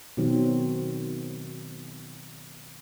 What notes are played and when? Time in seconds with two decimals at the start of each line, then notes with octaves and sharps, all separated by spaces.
0.17 B2 D#3 F#3 C4